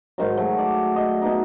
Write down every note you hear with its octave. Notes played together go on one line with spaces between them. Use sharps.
G#2 D#3 F#3
F#3 A3
D5
D#5
B2 D#4